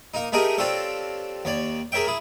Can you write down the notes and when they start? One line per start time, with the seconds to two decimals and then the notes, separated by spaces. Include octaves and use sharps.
0.14 A#3 D#4
0.32 A3 D#4 G4 G#4 A#4 D#5
0.58 C4 D4 F4 G4 A4 C#5
1.45 D#2 C#5 D5
1.92 G#4 A#4 C#5 E5 G5
2.07 E4 G#4